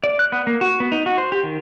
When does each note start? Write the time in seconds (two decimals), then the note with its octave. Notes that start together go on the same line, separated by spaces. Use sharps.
0.04 D5
0.19 F#6
0.32 B3
0.47 A#3
0.61 F#4
0.80 B3
0.92 D#4
1.06 F#4
1.18 C5
1.32 G4
1.43 D#3